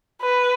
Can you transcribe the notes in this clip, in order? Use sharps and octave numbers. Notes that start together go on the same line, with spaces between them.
B4